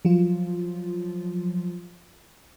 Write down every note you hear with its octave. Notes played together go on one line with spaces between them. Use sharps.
F3 F#3 F4